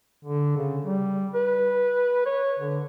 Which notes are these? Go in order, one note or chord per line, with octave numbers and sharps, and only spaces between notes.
D3
C#3
G3
B4
C#5
D3